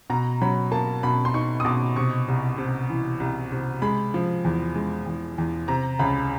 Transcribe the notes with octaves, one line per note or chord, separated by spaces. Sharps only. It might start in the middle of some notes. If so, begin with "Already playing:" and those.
B2 A#5
F#3 B5
A#3 A5
B2 B5
C6
D#4 C#6
D#6
B2 D6
C3 C#6
C2
C3
E3
C2
C3
G#3 B5
F3
E2
G#3
E2
E2
C3 A#5
C#2 B5